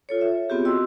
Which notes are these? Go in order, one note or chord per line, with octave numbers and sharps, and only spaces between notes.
F4 A4 C#5
E5
B3 C4 F4 G4 G#4
F#4 D#5 G5 C6 E6